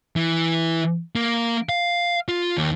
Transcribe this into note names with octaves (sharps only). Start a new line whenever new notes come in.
E3
A#3
F5
F4
D#2